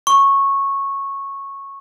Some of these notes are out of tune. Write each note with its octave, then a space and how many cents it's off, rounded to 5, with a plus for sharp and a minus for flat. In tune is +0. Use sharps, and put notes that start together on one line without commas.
C#6 -10